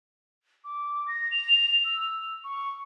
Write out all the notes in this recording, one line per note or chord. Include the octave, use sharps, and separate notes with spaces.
D6
A#6
F7
E6
C#6